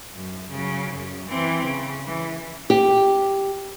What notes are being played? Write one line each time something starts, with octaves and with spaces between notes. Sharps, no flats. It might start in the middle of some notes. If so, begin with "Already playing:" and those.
F#2
C#3 F#3
F#2
E3 C4
C#3
E3
G4